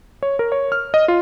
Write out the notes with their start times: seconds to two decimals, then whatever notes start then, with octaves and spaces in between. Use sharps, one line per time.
0.23 C#5
0.39 A#4
0.52 C#5
0.72 F6
0.94 D#5
1.08 F4